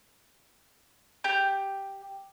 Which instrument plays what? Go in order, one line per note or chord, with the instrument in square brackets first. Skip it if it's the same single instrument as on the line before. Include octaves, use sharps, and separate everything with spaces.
[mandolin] G4 G6